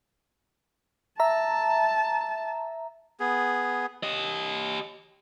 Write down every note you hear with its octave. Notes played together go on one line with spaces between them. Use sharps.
E5 A5 A#5
B3 G#4
G4 D#5